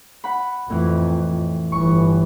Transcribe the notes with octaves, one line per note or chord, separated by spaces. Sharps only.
F#5 B5
F2 A2 E3
G1 E3 C#6